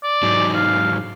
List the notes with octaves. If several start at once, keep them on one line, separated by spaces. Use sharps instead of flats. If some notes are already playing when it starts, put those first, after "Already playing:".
D5
G#2 F#3 D#4
F5